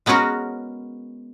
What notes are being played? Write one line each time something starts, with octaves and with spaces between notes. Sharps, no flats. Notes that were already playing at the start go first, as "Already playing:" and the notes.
G#3 B3 C#4 F#4 A#4